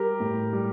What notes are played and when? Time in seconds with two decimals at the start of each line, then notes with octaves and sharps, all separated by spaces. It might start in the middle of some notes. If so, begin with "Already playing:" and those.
Already playing: G3 G4 A#4
0.20 A2
0.53 G3